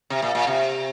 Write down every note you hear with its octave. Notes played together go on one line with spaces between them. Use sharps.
C3
A#2
A#2
C3